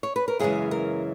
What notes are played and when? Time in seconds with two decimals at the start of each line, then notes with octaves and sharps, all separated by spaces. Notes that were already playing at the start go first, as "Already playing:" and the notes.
0.03 C#5
0.16 B4
0.28 A#4
0.39 F#2 C#3 E3 G#3 G#4
0.71 A#4